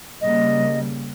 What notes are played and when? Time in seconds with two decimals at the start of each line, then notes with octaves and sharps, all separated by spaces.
0.21 C#3 G3 A#3 D#5